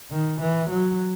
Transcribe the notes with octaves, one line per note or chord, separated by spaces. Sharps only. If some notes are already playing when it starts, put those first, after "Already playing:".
D#3
E3
F#3